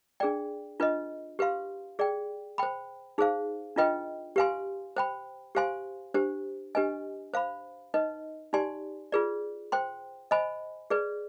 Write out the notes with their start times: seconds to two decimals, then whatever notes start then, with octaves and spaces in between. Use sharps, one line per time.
0.20 D4 G#4 D5 G5
0.80 D4 F4 B4 D#5
1.39 G4 B4 F5 C6
1.99 G#4 D5 G5
2.58 C5 G5 B5
3.18 D#4 G#4 C5 F5
3.76 D4 F4 B4 D#5 G5
4.36 G4 B4 F5 G#5 C6
4.96 C5 G5 B5
5.55 G4 C5 F5 G#5 C6
6.14 D4 G4 C5
6.75 D4 G4 B4 D#5 G#5
7.34 C5 F5 B5
7.94 D#4 B4 D#5
8.53 D#4 G4 D5 G#5 C6
9.12 F4 G#4 B4 D5
9.72 C5 G5 C6
10.31 C5 D#5 G#5 B5
10.90 G#4 B4 D5